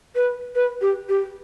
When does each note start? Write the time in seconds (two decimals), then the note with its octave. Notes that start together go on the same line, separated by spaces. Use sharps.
0.15 B4
0.55 B4
0.81 G4
1.09 G4